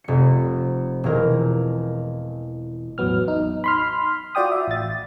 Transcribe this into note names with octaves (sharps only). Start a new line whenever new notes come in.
F1 C#7
E1 E3 A#4
A1 E2 F#3 B3 F6
D#4
B5 C6 F6
F4 F#4 D5 G5 D#6
E5
A1 A6